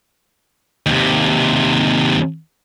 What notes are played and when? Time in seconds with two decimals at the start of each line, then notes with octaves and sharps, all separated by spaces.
0.86 D#2 C3